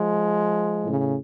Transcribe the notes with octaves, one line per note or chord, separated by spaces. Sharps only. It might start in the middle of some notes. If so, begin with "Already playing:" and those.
Already playing: F3 G#3
A2 C#3